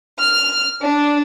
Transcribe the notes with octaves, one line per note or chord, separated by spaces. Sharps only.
F6
D4